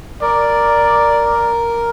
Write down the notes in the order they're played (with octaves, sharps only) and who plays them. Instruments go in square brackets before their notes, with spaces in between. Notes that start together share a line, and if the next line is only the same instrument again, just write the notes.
[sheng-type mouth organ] A#4 [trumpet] D5